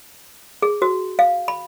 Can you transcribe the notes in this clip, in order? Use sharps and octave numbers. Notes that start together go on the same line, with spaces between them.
G#4
F#4
F5
B5